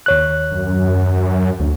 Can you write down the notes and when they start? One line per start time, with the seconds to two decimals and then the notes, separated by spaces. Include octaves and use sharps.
0.06 D#2 C#5 F#6
0.52 F#2
1.60 D2